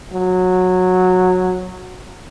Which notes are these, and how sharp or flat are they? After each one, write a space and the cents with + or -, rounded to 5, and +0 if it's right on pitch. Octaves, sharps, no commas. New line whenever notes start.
F#3 -15